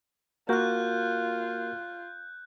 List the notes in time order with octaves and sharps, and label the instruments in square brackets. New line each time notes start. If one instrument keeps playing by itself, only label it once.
[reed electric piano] A#3 F#4 A#4 [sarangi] F4 [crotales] F#6 G6